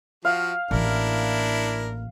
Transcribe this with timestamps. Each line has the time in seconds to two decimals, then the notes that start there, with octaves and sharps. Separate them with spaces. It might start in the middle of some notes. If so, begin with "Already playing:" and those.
0.25 F3 F#4 F5
0.71 A1 A#3 D4 E4 A#4